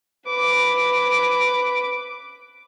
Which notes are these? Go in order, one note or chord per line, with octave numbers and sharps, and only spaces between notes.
B4 D6